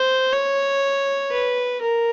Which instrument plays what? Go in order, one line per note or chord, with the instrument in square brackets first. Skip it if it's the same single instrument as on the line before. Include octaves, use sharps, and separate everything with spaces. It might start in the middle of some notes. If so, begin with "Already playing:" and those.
Already playing: [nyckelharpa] C5
C#5
B4
A#4